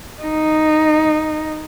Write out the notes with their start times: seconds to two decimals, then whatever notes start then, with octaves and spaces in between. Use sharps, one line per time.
0.23 D#4